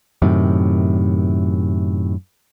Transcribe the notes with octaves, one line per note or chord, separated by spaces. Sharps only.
F#2 A2 C3 D#3